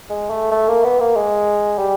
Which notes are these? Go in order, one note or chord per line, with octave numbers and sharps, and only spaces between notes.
G#3
A3
A3
A#3
B3
A#3
G#3
G3